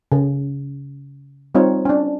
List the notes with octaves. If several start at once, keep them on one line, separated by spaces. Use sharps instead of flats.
C#3
G3 C4 D#4 F4 C#5
C#4 D4